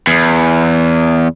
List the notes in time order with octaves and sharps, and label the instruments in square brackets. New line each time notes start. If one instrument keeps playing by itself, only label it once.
[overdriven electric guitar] E2